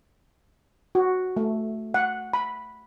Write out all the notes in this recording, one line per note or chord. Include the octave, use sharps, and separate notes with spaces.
F#4
A3
F#5
B5